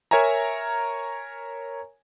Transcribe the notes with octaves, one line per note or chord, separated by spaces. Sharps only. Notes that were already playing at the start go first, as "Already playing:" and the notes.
A#4 C#5 E5 G#5 A#5